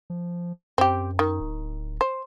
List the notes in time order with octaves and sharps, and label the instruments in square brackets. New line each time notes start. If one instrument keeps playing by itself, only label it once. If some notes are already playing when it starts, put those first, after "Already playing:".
[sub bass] F3
[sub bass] F#2 [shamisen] C4 G4
[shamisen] D#3
[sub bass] D1
[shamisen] C5